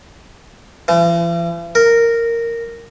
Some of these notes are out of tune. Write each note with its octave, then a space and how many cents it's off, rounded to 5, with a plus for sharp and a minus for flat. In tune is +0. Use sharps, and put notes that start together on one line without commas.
E3 +45
A#4 -10